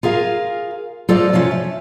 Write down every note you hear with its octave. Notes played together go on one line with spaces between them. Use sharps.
F4 G#4 A#4 F5
F4 A4 C5 D5 D#5 F5
C3 F3 C#4 F4
E5